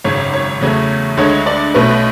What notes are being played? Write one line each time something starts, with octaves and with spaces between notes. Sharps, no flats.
G#1 F#2 C#3 C#5
C#5
E2 C#3 F#3 A3
D2 D3 G#3 C#5
D5
B1 B2 A3 C#4 B4